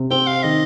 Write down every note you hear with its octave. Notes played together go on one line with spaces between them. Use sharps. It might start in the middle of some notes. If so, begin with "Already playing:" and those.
Already playing: C3
C4 G5
F5
D#3 D#5